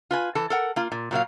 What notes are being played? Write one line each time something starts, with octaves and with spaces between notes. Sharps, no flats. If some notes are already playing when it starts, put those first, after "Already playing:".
F4 B4 G#5
E3 A4
A4 A#4 F#5
A#3 F4
A#2
A#2 F#3 A#3 F5